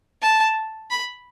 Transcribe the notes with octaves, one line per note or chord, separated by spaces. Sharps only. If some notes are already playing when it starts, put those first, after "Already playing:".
A5
B5